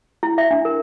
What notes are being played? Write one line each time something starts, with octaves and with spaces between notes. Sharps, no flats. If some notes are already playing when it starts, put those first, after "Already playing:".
E4
E5
D4
A#4